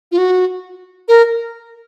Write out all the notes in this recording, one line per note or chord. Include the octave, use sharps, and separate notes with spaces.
F4
F#4
A#4